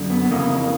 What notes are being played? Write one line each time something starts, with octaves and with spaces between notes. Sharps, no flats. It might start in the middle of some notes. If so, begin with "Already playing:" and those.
Already playing: F#2 D3
B3
B3
F2 C#3 E3 A#3